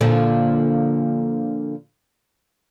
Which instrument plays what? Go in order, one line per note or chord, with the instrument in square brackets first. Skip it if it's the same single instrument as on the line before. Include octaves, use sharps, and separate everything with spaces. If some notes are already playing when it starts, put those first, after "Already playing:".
[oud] A#2 D3 F3